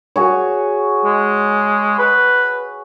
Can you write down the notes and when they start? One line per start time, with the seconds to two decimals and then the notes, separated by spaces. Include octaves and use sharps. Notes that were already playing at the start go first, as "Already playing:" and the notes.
0.16 F#4 G#4 C#5
1.05 G#3
1.99 B4